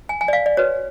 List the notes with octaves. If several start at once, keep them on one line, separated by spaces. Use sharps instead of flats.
G#5
G#5
D5
F5
D5
F#4 B4 C#5